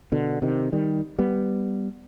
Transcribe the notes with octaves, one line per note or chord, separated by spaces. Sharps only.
B2 D3
C3 D#3
D#3 G3
G3 B3